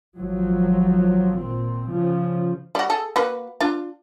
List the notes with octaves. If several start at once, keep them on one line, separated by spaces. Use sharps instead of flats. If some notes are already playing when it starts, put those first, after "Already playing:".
G#1 F3 F#3
A#2 C4
C#3 F3
G3 F#4
G#4 A4
A#3 F#4 B4
D4 F4